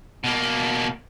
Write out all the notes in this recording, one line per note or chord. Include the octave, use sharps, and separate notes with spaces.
B2 A#3